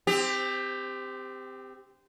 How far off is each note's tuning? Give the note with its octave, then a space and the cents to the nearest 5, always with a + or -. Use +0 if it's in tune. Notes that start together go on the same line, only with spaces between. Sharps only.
C4 -20 G4 +20